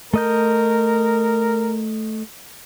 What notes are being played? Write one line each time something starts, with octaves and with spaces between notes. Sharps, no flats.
A3 A#4 D#5 G6